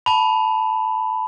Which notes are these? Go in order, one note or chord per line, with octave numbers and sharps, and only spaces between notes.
A5 B5